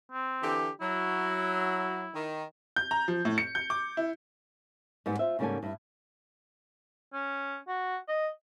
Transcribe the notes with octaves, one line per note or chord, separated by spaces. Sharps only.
C4
D3 E3 G4
F#3 E4
D#3
G6
A#5
F3
A2
C#7
G6
D6
E4
G#2 G3 B3
F4 C5 E5
G#2 C#3 G3 A#3 A4 G#5
G2 E4
C#4
F#4
D#5